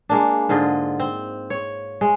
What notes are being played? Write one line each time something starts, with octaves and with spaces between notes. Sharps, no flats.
G#3 A#3 D4
G#2 D3 F4 D#5
C4
C#5
G#3